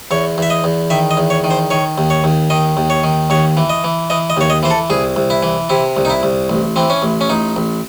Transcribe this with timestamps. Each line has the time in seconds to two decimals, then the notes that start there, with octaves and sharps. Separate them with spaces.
0.11 E2 C#5
0.38 E2 E5
0.50 D#5
0.64 E2
0.90 D#3 E5
1.11 D#5
1.17 E2
1.30 C#5
1.44 D#3
1.51 C5
1.71 D#3 C#5
1.98 D#2
2.10 C#5
2.24 D#2
2.50 D#3 D#5
2.77 D#2
2.90 C#5
3.04 D#3
3.30 D#2 C#5
3.57 E3
3.70 D#5
3.84 E3
4.10 E3 D#5
4.30 D#5
4.37 D#2 C#5
4.50 D#5
4.63 E3 C5
4.70 A4
4.90 C2 G#4
5.16 C2
5.30 E4
5.43 E3
5.69 C3 E4
5.97 C2
6.05 D#4
6.10 E4
6.23 C2
6.50 A1
6.76 E3 C4
6.90 C#4
7.02 A1
7.21 C#4
7.30 A1 D#4
7.56 A1